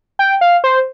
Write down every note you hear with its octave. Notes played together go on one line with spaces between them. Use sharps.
G5
F5
C5